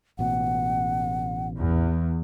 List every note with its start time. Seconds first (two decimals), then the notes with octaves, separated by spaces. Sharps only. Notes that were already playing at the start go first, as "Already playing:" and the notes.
0.19 A1 B2 F#5
1.58 E2